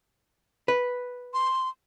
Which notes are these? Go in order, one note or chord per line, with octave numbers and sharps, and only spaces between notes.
B4
C6